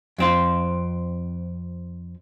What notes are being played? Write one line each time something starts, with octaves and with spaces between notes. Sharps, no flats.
F2 C4 F4